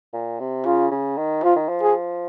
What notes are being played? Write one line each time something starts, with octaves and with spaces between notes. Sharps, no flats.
A#2
C3
C#3 F4
C#3
D#3
F3 F4
D#3
F3
G#4